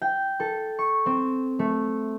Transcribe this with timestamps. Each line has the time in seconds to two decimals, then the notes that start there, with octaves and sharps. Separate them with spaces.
0.02 G5
0.40 A4
0.79 C#6
1.06 C4
1.59 A3